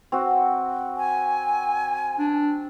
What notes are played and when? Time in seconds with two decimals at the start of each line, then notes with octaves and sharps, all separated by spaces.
0.12 C4 F#4
0.97 G#5
2.19 D4